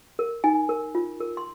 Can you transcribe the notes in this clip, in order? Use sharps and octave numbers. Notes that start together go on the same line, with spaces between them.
A#4
D#4 G#5
A#4
F4
A#4
C6